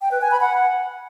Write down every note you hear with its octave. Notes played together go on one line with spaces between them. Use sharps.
G5
B4
G#5
B5
F#5